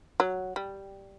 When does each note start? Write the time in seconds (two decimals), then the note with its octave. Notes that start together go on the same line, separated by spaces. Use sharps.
0.20 F#3
0.56 G3